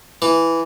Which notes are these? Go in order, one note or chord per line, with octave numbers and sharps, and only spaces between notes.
E3